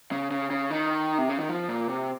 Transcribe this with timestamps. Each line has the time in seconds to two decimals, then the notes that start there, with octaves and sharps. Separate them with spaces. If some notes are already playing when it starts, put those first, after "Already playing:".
0.12 C#3
0.31 C#3
0.50 C#3
0.70 D#3
1.18 C3
1.29 C#3
1.40 D#3
1.49 F3
1.69 A#2
1.89 C3